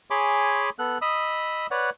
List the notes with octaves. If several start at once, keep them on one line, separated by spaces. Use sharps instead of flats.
G#4 C#5 G#5 B5 C6 D6
B3 A4 F#6
D#5 B5 D#6 E6
B4 C#5 D5 F#5